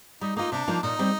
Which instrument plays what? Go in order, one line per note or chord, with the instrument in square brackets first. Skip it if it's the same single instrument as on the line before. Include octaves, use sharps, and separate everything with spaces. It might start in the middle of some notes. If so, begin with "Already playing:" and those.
[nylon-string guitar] G3 [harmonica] D#4
[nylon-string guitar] A#3 F4 [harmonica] D#4
[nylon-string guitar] C3 [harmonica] D4
[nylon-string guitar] F3 A#3 D#4
[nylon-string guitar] A#2 [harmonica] D#4
[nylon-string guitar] G3 C4